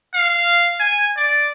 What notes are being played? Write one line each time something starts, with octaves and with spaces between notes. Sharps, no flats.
F5
G#5
D5